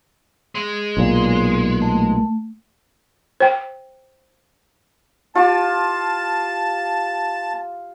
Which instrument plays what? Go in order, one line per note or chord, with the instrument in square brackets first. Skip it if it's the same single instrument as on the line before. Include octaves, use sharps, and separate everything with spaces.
[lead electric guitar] G#3
[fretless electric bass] B1 A#2
[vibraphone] A3
[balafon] C5 G5
[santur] F4 G4 [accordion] A5